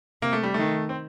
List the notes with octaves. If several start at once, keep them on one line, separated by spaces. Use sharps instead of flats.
C3 A#3
A3
G3
D#3 A3
C4